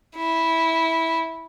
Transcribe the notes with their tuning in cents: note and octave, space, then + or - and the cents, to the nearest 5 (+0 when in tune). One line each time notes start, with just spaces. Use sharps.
E4 -10